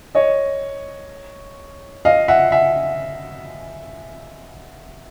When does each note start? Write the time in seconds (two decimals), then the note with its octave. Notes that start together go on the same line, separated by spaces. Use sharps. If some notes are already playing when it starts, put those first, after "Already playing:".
0.15 C#5 D#5
2.05 D#5 F5
2.28 E5 F#5
2.52 E5 F#5